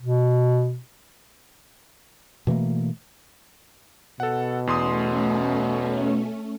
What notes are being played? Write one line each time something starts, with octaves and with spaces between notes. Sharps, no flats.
B2
B2 E3 A3 A#3
B2 A4 F#5
E2 A3 C#4 C6 D#6